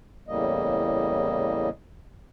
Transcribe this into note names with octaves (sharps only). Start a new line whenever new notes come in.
E2 A2 C#3 G3 A#3 D#5